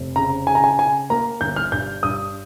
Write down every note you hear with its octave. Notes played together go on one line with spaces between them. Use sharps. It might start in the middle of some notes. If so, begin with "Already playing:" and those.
Already playing: F1
C#3 A#5
C#3 G#5
A#5
G#5
C#3 G#5
A#3 A#5
G1 G6
F6
G2 G6
G2 D#6